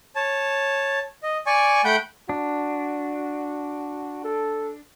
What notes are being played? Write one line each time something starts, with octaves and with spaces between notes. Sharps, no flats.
C#5 A5
D#5
D5 G#5 C#6
A3 F#5 G5 B5 G6
D4 F#4
A4